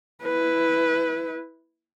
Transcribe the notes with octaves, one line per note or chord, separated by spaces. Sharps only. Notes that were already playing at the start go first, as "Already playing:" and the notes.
E4 B4